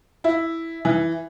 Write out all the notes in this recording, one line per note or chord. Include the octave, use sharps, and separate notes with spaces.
E4
E3